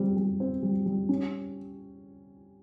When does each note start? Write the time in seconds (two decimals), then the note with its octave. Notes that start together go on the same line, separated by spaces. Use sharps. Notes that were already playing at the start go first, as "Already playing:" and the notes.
Already playing: G3 C4
0.17 G3
0.40 C4
0.63 G3
0.86 G3
1.09 C#4